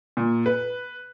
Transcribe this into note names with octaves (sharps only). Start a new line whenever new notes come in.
A#2
B4